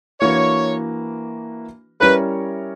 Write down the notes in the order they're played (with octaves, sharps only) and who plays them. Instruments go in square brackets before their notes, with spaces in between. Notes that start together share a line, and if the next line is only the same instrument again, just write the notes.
[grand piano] E3 A#3 D4 F#4 B4 [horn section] C#5
[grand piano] G3 C#4 E4 A#4 C#5 [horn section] B4